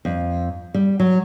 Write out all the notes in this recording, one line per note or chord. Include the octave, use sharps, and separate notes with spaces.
F2
G3
F#3